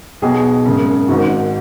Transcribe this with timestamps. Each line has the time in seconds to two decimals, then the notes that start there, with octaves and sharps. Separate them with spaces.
0.22 B1 B2 G#4
0.66 G#1 F#2 C#3
1.08 G#1 G#2 D#3 F#4